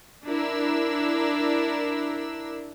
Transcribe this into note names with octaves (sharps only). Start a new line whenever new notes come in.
D4 E4 A#4 E6